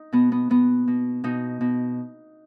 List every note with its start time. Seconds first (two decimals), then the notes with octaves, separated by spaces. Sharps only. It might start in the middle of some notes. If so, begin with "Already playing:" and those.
Already playing: D#4
0.12 B2 B3
0.32 B3
0.50 B2 B3
0.88 B2
1.24 B2 D#4
1.61 B2